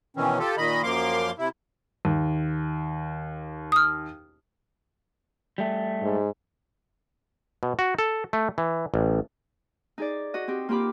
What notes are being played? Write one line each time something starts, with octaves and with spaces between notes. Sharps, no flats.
B2 D#3 E3 C4 C#4
F4 G4 A4
A#2 D#3 D#5 B5
F#2 F3 A#3 F5 C6 D6
C3 E4
D#2
D#6 F6
G3 A3
G#2
B2
F#4
A4
A3
E3
A1
D#4 G#4 D5
F#4 D#5
C4 G4
A#3 F4 G4 B5 D6